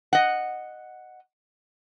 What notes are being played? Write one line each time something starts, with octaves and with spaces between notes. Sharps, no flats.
D#5 F#5